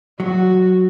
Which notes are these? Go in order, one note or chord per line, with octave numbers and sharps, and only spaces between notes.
F#3 F#4